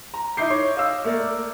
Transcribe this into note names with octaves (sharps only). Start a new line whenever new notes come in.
A#5
D#4 E4 D6 G6 C7
C#5
D#5 F5 E6
A3 A#3 A#4 D5